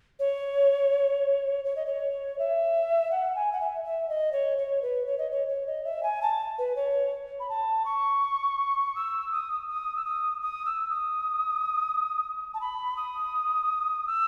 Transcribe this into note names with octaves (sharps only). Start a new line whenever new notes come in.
C#5
C#5
D#5
C#5
E5
F#5
G#5
F#5
E5
E5
D#5
C#5
C#5
B4
C#5
D#5
C#5
C#5
D#5
E5
G#5
A5
B4
C#5
B5
A5
C#6
E6
D#6
D#6
E6
D#6
D#6
E6
D#6
A5
B5
D#6
E6